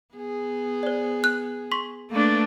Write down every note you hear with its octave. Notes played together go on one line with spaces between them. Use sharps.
B3 G#4
C5 D5
F#6
C6 C#6 B6
A3 A#3 D4 B4